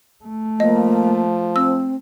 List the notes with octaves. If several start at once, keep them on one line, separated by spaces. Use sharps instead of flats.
A3
F3 A#3 D#5
C4 E6